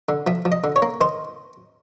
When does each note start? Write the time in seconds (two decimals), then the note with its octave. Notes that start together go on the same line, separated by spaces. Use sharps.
0.09 D3
0.27 F3 E5
0.45 F3
0.52 D#5
0.64 D3
0.76 C#5
0.82 A#3
1.01 D#3 C5